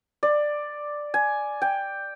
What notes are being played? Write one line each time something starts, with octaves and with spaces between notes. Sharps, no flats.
D5
G#5
G5